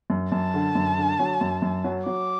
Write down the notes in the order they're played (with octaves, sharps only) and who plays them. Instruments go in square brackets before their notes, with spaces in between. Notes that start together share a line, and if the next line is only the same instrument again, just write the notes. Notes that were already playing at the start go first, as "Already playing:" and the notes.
[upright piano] F#2
[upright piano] F#2 [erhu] A5
[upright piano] D3
F#2
D3
F#3
F#2
F#2
F#3
[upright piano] F#3 [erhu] D6